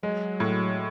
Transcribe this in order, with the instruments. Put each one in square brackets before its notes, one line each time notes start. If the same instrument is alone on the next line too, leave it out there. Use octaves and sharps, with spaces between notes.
[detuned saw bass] F#3 [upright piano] G#3
[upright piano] A2